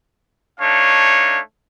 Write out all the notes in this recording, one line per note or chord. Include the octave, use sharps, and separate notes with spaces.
A3 D4 D#4 C#5 F5